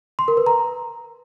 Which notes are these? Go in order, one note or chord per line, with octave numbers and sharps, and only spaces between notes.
C6
A#4
B4
A#5